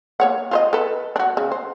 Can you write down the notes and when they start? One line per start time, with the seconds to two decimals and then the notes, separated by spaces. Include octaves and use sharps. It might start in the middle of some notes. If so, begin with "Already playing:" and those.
0.20 A#3 C#5 F#5
0.51 F4 C5 D#5
0.73 A4 B4
1.16 D4 F#4
1.37 C#3
1.52 C5